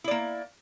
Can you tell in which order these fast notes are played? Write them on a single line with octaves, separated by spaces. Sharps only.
E4 D5 A#3